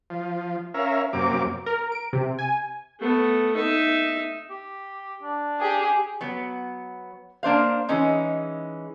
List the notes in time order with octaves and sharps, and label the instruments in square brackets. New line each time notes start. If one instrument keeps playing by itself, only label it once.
[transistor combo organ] F3
C#4 A#4 E5 F5
F#2 C3 A#3 D6
[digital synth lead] A#4
D7
C3
G#5
[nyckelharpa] A3 B3
D#4 E5
[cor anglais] G4
D4
[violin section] G4 G#4
[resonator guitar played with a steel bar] F#3 B3
A#3 D4 C5 F5
E3 G#3 C#4 D#4